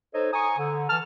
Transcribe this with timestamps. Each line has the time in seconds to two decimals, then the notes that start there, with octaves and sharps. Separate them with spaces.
0.14 D#4 A4 C5 C#5 D#5
0.33 G#5 A#5 C#6 D#6
0.59 D3
0.90 E3 A5 F6